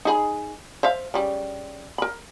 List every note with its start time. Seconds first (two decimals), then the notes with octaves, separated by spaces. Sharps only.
0.05 D#4 G#4 B5
0.83 C5 E5 F5
1.14 C#3 G3
1.98 A#4 B5